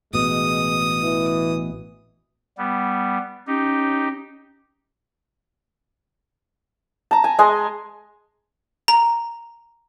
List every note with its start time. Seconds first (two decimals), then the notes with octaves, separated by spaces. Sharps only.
0.13 A1 B2 G#3 D#6
1.03 E3
2.58 G3 B3
3.47 C#4 D#4 G4
7.11 A5 A#5
7.24 G#5
7.39 G#3 D#5 G#5 C6
8.88 A#5